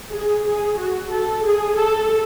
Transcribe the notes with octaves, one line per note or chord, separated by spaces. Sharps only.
G#4
G#4
F#4
A4
G#4
A4